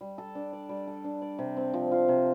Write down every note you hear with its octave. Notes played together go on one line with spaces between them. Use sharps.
G3
A4
D4
D5
G3
A4
D4
D5
C3
C4
F3
F4
C3